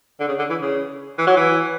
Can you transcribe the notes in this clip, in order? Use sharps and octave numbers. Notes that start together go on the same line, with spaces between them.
D3
C#3
D3
E3
C#3
E3
F#3
E3